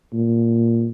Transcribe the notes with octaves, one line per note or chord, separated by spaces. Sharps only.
A#2